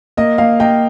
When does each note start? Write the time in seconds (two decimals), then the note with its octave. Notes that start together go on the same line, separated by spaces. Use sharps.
0.17 A#3 D#5
0.38 A#3 F5
0.60 A#3 D#5 G5